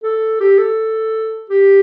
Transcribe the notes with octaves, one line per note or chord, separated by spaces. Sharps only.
A4
G4
A4
G4